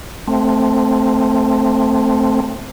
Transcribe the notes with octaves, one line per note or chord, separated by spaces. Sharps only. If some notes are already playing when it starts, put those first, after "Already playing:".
A3 C4